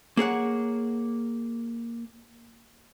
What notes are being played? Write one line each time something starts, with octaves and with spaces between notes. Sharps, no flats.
A#3 G#4 C#5 F#5